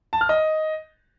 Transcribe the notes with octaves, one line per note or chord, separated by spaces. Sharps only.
A5
F6
D#5